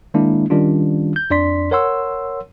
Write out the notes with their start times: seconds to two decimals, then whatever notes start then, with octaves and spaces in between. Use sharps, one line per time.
0.14 D#3 G#3 A#3 D4 E4
0.50 D#3 G3 C#4 D4 F4
1.16 G6
1.30 F2 D4 D5 C6 B6
1.71 A#4 C#5 F#5 C6 E6